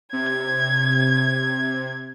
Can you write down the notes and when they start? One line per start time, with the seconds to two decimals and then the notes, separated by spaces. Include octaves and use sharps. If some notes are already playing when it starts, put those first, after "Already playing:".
0.13 C3 G#6